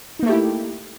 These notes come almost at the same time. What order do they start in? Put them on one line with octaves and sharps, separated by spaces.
D#4 A#3 A3 G4 E4